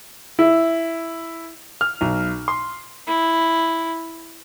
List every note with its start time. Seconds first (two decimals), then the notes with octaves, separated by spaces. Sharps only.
0.39 E4
1.81 F6
2.01 B1
2.48 C6
3.08 E4